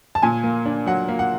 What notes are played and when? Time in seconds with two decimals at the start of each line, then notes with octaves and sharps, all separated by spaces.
0.15 A5
0.22 A#2 G#5
0.44 A#3
0.66 D4
0.87 F#3 F#5
1.08 A#3
1.19 F#5